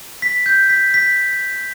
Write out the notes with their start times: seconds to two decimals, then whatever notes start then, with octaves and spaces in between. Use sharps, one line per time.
0.22 B6
0.46 G6
0.70 B6
0.94 B6